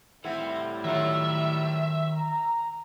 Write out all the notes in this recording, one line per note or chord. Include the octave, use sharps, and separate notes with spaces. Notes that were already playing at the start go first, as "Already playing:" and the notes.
A2 G3 C4 E4 A4 F#5
D#3 F#3 D#4 F4 E5
A#5